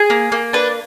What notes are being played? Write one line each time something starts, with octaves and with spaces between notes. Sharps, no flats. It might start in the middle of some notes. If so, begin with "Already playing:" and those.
Already playing: G#4
A#3
A#3
D4 B4